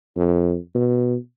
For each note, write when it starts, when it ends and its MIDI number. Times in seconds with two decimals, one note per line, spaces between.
0.17 0.56 41
0.75 1.16 47